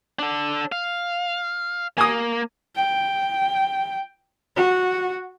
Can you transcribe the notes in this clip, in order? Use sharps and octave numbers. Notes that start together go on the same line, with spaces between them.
D4 A4
F5
A#3 G#5 D#6
G5
F#4